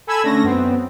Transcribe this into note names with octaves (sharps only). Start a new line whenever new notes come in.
A4 G#5 B5 E6 G#6
D3 A3 C#4 A#6
F#2 B3 C4